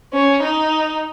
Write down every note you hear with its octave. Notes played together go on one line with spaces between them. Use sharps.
C#4
D#4